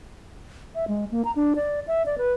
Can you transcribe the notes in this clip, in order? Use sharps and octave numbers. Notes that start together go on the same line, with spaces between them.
E5
G#3
A#3
A#5
D4
D5
E5
D5
B4